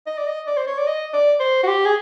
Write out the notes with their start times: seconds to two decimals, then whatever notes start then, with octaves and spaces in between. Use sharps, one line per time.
0.06 D#5
0.18 D5
0.27 D#5
0.47 D5
0.57 C5
0.67 C#5
0.78 D5
0.87 D#5
1.13 D5
1.40 C5
1.63 F#4
1.67 G4
1.85 G#4